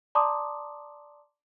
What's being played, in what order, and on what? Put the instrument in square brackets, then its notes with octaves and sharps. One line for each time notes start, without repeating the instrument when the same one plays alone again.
[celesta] D5 A5 A#5 C6 D6 D#6